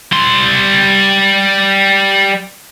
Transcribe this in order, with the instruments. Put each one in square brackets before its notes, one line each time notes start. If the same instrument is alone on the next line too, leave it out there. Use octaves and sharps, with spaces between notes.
[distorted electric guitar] G3 C6